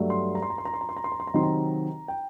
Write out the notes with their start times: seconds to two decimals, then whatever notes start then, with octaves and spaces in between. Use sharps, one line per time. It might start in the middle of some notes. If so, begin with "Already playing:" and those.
Already playing: G2 F#3 A3
0.10 C6
0.35 A#5
0.42 C6
0.50 A#5
0.58 C6
0.65 A#5
0.74 C6
0.81 A#5
0.89 C6
0.96 A#5
1.04 C6
1.12 A#5
1.20 C6
1.27 A#5
1.34 C3 D#3 F#3 C4 D#4 C6
1.43 A#5
2.08 G5